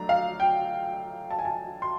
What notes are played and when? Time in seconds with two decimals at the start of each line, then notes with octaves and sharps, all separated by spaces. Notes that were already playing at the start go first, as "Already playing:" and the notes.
Already playing: F#3 A3 D4 A#5
0.09 F5
0.40 G5
1.31 A5
1.39 G#5
1.45 A5
1.82 C6